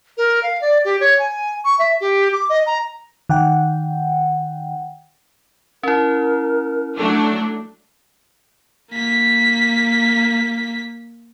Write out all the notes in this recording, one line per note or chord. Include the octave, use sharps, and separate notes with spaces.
A#4
F5
D5
G4
C#5
G#5
C#6
E5
G4
D6
D#5
A#5
D#3 F#5 G5
C#4 E4 A#4
F#3 A3 D4
A#3 B6